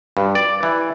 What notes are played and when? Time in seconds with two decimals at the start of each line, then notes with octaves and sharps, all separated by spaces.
0.17 G2
0.35 D5
0.63 E3